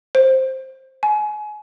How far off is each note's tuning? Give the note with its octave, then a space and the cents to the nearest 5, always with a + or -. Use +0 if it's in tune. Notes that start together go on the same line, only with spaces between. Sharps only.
C5 +10
G#5 +30